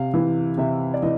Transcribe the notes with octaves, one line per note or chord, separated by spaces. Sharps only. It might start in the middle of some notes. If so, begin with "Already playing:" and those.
Already playing: C3 F5
E3
C3 E5
D5
E3 D#5